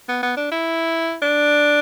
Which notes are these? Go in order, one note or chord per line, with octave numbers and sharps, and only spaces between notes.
B3
B3
D4
E4
D4